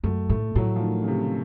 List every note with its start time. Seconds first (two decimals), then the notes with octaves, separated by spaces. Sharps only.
0.04 F#2 A3
0.29 A2 A3
0.56 A2 F#3
0.76 F3
0.82 D#3
1.03 C#3
1.08 C3